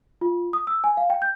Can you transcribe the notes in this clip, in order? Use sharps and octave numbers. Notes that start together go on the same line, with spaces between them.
F4
D#6
E6
G#5
F5
G5
G6